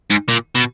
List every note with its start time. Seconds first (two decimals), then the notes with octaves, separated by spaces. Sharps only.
0.11 G#2
0.29 A#2
0.55 B2